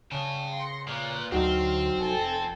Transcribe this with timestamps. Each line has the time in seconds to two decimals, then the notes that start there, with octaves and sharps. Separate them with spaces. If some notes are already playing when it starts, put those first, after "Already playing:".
0.12 C#3 G5 A5
0.52 C6 A#6 C#7
0.88 A#2 B4 F#6
1.32 D2 F#3 C4 D#4 F#4 C6 F6
1.98 F1 A4 G5 G#5